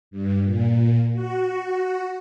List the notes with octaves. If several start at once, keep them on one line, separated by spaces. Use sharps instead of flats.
G2
A#2
F#4